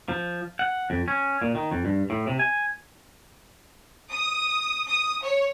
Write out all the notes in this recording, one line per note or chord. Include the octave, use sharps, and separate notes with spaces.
F3
F#5
F2
C#4
A#2
D#3
F2
G2
A2
C3
G#5
D#6
D#6
C#5